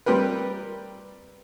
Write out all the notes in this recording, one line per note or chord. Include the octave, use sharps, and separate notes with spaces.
G3 C4 G4 A#4 B4